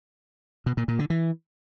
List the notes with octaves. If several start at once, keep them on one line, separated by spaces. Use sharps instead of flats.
B2
A#2
A#2
D3
E3